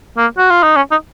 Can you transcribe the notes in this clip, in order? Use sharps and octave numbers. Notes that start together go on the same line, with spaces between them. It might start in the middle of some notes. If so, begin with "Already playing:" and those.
A#3
F#4
F4
D#4
C#4
D#4